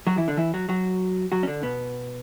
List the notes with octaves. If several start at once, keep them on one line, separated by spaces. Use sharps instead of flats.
F#3 F#4
E3 E4
D3 D4
E3 E4
F#3 F#4
F#3 F#4
F#3 F#4
C#4
D3 D4
B2 B3